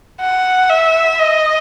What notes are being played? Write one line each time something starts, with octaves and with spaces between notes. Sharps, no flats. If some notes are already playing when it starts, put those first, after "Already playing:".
F#5
E5
D#5